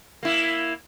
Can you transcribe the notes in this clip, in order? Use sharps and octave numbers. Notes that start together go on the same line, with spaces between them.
A#3 E4